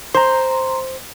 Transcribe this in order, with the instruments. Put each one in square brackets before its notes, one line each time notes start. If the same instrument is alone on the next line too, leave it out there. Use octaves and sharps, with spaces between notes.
[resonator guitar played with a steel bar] C5 [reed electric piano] A#5 C6